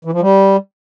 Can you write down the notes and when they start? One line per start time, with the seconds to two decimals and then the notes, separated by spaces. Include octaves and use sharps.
0.05 E3
0.13 F3
0.21 G3